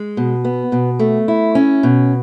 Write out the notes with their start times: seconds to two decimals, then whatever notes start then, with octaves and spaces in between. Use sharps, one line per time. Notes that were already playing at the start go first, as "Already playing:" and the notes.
Already playing: G#3
0.17 B2
0.45 B3
0.72 B2
0.99 A3
1.28 E4
1.55 C#4
1.83 B2